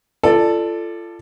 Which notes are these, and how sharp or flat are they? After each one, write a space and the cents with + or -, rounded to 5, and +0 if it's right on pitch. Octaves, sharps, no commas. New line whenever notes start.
F4 -30 A4 +5 D5 +15